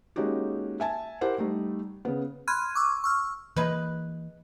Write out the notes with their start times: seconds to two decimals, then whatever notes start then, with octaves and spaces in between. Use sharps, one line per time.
0.16 G#3 A#3 C#4 D#4 F#4 G4
0.80 E5 G#5 A5
1.21 E4 G4 A#4 C5 F#5
1.38 G3 A3 D#4
2.05 C#3 B3
2.47 B5 C6 F6 F#6 G#6 D#7
2.75 C#6 D6 E6
3.04 C#6 E6 F6
3.56 E3 G#3 A#3 D#4 B4